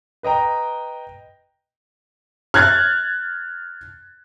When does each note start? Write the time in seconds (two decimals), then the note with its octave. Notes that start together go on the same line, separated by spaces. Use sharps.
0.23 B4 D#5 G5 A#5
2.54 F6 F#6 G#6 A6